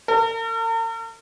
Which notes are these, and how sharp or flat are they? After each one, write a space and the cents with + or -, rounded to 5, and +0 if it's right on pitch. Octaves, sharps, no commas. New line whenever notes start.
A#4 -45